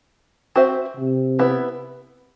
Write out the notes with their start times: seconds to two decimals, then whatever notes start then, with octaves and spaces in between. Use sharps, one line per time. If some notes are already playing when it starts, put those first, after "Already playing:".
0.56 C4 F#4 C5 E5
0.97 C3
1.39 B3 E4 B4